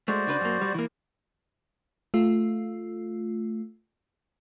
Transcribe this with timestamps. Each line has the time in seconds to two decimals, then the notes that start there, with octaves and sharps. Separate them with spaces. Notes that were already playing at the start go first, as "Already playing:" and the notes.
0.08 G#3 A3 F#4 C5 D5
0.27 C#3 D4 B4
0.41 F#2 A#3
0.61 G3
0.74 E3 A#3
2.14 A3 F4